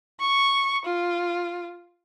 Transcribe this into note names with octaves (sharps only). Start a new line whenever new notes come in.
C#6
F4